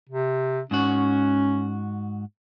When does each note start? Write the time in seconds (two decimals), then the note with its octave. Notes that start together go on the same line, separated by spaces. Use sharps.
0.09 C3
0.71 G#2 C#4 F#4